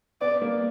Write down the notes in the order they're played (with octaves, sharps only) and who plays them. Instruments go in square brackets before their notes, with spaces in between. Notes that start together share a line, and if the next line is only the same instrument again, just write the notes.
[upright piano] B3 [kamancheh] D5
[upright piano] A#3